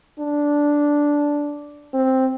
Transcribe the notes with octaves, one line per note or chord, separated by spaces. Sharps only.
D4
C4